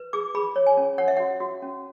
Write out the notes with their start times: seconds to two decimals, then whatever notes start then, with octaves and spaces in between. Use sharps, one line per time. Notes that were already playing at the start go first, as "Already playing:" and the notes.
Already playing: B4
0.13 G#4 D6
0.35 G#4 B5
0.56 C#5
0.66 G#5
0.77 C#4
0.98 C#5 F#5
1.08 E5
1.17 F#4 F#5
1.40 F#4
1.62 C#4